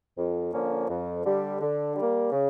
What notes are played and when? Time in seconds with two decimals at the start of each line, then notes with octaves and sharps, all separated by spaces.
0.18 F2
0.53 D3 F3 A#3 C#4
0.89 F2
1.25 D3 G3
1.60 D3
1.96 G3 A#3
2.31 C#3